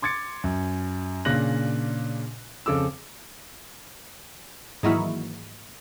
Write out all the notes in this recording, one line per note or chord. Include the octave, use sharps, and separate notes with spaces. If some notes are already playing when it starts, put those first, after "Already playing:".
C6 D6 G#6 A6 C#7
F#2
A#2 C#3 D4 F#6 A#6 F#7
F2 C#3 A4 D6 E6
G#2 D#3 E3 F#3 A#3 E4